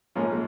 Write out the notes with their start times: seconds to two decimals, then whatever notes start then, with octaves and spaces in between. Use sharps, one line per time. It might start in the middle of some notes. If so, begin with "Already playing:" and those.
0.15 A#1 G#2 F3 A#3 C#4
0.31 G#3